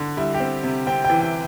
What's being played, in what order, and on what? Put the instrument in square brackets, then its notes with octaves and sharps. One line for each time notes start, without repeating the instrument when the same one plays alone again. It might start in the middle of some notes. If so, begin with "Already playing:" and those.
Already playing: [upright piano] D3
G3 E4
G4
C4
C3
C4 G5
G5
E3
G5